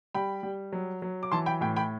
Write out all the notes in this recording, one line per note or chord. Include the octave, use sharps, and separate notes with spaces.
G3 G5 B5
G3
F#3
F#3
D6
E3 A5 C6
G5 B5
A2 G5 B5
G5 B5